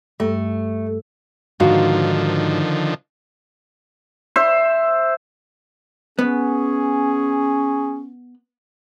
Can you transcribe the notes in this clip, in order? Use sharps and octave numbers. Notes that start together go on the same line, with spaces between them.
G2 G3 A3
G#2 D3 D#3 F3 F#4 F5
C5 E5
B3 C#4 G#4